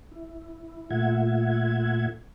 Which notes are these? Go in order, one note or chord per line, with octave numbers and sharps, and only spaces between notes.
E4
A#2 A3 F4 E5 F#5 G#6